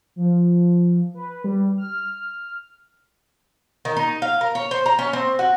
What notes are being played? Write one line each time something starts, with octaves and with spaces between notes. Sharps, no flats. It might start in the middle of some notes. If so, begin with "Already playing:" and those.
F3
B4
G3
F6
D#3
D#4
F5
A#4
C#5
C5
A#5
C#4
C4
F#4